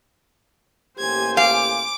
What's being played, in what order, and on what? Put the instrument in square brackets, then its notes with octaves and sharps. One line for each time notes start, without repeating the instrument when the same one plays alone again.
[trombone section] A1 A#3 G4 [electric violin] C5 G#5 [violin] G#6
[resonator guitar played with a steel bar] F5 [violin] D6